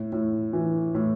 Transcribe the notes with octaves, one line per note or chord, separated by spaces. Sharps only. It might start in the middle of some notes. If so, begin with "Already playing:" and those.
Already playing: A2
A2
E3
A2